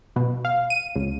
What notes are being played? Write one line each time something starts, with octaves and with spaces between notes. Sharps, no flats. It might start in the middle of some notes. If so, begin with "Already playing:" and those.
B2
F5
D#7
C#2